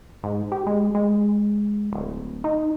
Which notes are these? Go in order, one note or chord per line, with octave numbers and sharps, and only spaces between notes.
G#2
G4
G#3
G#3
D1
D#4